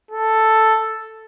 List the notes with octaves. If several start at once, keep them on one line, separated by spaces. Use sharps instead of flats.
A4